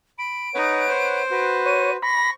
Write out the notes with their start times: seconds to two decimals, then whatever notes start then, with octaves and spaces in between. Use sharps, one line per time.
0.19 B5 D7
0.54 D#4 B4 C#5 F#5
0.89 C5
1.31 F#4 B4
1.66 C#5 D#7
2.03 B5 C#6 A#6